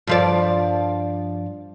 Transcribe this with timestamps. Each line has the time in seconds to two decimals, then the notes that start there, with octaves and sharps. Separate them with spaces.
0.07 G2 F3 D5